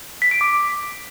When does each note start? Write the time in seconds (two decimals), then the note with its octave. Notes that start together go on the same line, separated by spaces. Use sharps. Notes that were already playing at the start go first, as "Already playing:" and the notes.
0.22 B6
0.31 D7
0.41 D6